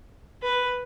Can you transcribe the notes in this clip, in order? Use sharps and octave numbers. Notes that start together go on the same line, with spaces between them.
B4